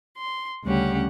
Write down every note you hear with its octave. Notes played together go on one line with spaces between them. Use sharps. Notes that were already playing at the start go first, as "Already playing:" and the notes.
C6
D2 C#3 G3 C#4 G4 F#5